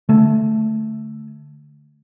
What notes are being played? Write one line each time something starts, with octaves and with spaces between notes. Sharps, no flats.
D3 A3